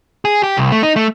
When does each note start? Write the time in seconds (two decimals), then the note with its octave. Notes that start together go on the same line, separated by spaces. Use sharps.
0.25 G#4
0.43 G4
0.58 C2
0.72 A3
0.83 D#4
0.96 A3